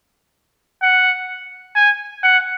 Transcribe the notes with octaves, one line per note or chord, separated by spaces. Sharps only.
F#5
G#5
F#5